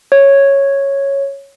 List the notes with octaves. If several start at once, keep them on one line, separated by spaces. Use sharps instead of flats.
C#5